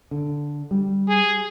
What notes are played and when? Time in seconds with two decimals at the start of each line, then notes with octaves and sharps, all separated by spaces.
0.11 D3
0.71 G3
1.08 G#4